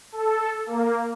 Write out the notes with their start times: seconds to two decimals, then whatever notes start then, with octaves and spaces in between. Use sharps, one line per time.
0.12 A4
0.66 A#3